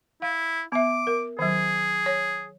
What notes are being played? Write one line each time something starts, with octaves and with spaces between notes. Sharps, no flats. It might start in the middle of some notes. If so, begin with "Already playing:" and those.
E4 F5
B3 E5 D6
A#4
D#3 F#3 G#4
C#5